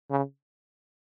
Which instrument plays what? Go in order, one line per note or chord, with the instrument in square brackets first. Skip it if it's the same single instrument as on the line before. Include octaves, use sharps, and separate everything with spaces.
[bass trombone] C#3